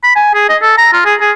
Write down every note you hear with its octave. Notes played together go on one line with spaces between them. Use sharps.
B5
G#5
G#4
D#5
A4
A#5
F4
G#4
G#4